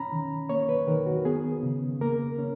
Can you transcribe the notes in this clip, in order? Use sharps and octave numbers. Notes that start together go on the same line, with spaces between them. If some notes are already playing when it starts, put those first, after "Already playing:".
Already playing: C#4 A#5 B5
D#3
A#3 C#5
B4
D#3 A#4
F#4
B3 G#4
C#3
A#3 A#4
C#4